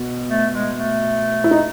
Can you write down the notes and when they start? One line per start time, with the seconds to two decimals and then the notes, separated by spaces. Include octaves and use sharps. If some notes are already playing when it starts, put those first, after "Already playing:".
Already playing: B2
0.30 A3
0.54 G#3
0.76 A3
1.44 E4
1.51 D#4